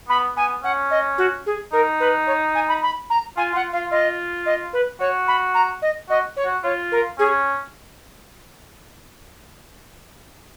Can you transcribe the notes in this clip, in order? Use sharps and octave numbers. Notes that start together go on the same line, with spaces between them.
B3 B5
B3 G#5
C#4 F#5
D#5
F#4
G#4
D#4 A#4
B4
C#5
G#5
B5
B5
A#5
F4 G#5
F4 F#5
F4 F5
F4 D#5
D#5
B4
F#4 C#5
B5
A#5
D#5
F#4 D#5
C#5
F#4
F4 C#5
A#4
C#4 G#4